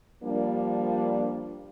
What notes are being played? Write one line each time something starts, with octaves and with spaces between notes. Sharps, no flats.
F3 G3 A#3 D4